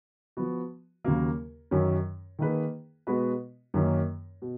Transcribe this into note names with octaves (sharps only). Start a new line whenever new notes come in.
F3 B3 F#4
D#2 C#3 F#3 A#3
F#2 D#3 F#3 C#4
D#3 A#3 D#4 G#4 B4
B2 G#3 B3 F#4 B4
F#2 D#3 A#3 C#4
B2